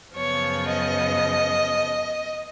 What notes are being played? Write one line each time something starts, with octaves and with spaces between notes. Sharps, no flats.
F#2 C#3 F3 B3 C#5
D#5